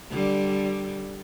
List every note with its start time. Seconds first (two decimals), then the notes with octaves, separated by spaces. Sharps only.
0.10 D3 G3